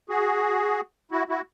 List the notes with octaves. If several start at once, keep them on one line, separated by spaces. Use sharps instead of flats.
F#4 G#4
E4 F#4
E4 F#4